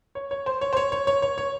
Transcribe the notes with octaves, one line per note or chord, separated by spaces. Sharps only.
C#5
C#5
C5
C#5
C5
C#5
C#5
C#5
C#5
C#5